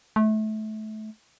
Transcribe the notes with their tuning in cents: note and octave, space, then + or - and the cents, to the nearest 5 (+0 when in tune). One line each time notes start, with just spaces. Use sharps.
A3 -25